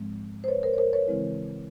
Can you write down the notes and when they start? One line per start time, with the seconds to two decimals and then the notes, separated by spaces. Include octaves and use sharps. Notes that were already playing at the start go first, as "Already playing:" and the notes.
Already playing: G#2 F3 G#3 C4
0.44 C5
0.48 B4 C#5
0.63 A#4 C5
0.73 C#5
0.78 A#4 C5
0.93 B4 C#5
1.08 C#3 E3 G#3 C4 E4